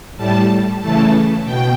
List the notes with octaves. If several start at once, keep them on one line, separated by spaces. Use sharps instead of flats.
A2 G3 A5
C#3 E3 A3 A5
B2 G5